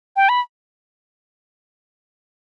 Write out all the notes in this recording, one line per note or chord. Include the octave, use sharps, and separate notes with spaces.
G5
B5